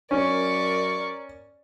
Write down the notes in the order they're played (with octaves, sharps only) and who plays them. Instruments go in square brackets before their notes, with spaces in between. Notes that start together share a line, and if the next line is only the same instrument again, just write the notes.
[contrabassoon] F#2 [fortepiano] C#4 [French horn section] A#4 [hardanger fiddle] D5 C#6